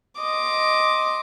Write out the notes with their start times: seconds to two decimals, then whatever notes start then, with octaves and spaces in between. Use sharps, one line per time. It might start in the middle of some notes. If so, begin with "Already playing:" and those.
0.21 D#5 C6 D6